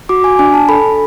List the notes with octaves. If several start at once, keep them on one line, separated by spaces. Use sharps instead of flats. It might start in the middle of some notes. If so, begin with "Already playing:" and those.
F#4 D6
G#5
D4 G#5
A5
A4 B5